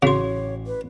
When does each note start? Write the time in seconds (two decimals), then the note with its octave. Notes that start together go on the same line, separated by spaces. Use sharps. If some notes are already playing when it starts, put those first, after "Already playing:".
0.03 A1 C#3 F#4 C#5 C6 D6 C7
0.67 B4